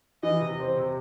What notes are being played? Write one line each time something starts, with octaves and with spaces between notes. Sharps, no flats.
E3 D#5
C3
C4
C3